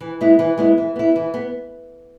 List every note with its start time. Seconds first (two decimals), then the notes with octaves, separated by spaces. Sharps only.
0.01 E3
0.21 G#3 B3 E4
0.39 E3
0.58 G#3 B3 E4
0.78 E3
0.96 B3 E4
1.16 E3
1.34 B3